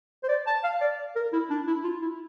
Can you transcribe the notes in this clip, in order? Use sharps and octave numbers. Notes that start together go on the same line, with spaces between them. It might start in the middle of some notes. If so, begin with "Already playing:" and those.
C5
D5
A5
F5
D5
A#4
E4
D4
E4
F4
E4